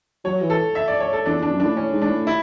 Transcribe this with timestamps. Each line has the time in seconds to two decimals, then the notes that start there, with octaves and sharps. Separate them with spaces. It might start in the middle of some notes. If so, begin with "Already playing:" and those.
0.24 F#3 C#5
0.42 E3
0.50 A4
0.75 E5
0.88 D5
1.00 C#5
1.13 A4
1.26 E2 D4
1.38 E2 D4
1.51 F#2
1.60 A2 D4
1.76 A2 C#4
1.92 G#2
2.02 D4
2.09 A2
2.27 E4